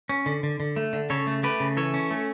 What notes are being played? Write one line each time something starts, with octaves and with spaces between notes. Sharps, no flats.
C#4
D3
D3
D3
A3
D3
C#3 A4 C#5
A3
A3 G4 B4
C#3
E3 A4 C#5
C#4
A3